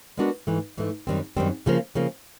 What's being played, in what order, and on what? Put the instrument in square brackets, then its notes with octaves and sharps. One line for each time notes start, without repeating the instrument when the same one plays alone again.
[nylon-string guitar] G#3 B3 D4 F#4 A#4
G#2 E3 A3
G#2 E3 A3
F#2 D#3 G3 C4
F#2 D#3 G3 C4
C#3 F3 A#3
C#3 F3 A#3